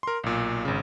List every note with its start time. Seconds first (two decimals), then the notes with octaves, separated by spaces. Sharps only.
0.03 A#4 C6
0.24 B1 A#2
0.65 G#1 C#3